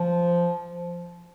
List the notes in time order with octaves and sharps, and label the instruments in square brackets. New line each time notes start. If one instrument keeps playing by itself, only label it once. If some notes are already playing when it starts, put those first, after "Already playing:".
Already playing: [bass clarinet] F3